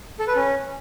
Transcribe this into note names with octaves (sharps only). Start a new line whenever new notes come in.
A4
B4
C#4